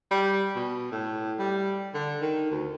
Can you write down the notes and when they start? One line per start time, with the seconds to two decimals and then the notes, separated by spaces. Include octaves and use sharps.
0.11 G3
0.56 B2
0.92 A2
1.39 G3
1.95 D3
2.21 D#3
2.51 D2